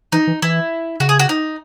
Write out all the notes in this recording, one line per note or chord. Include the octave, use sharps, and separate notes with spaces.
E3 D#4
E3
E3 E4
C#3 F#4
G#4
F#4
D#4